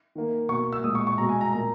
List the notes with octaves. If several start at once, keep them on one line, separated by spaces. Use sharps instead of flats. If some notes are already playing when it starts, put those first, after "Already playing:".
D#3 A#3
B2 A#3 C#6
E6
A#2 G#3 D#6
C#6
C#6
B2 G#3 A#5
G#5
A#5
A#2 A#3 A#5